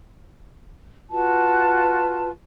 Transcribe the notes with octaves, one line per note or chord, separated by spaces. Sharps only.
F4 F#4 B4 A5